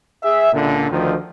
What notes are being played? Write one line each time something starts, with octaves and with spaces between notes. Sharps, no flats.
G#4 E5
C#2 A#2 D3
D2 D#3 F3